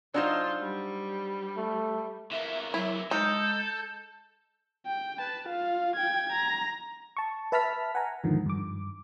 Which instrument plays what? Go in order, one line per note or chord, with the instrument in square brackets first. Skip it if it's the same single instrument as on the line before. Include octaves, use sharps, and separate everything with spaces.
[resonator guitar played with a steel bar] F#3 D#4 C5 [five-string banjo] D4 [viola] F4
[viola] G3
[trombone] A3
[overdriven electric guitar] E3 A#3 [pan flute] E5
[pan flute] F#3 [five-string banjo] E4
[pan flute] G#3 [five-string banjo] D#4 [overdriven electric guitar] A4 [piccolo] G6
[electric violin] G5
B4 A5
F4 F5
G5 G#6
A#5
[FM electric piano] A5 C#6
B4 E5 A5 B5 F6 B6
F#5 G#5 A#5
E2 G#2 D3 D#3 F3
G2 D6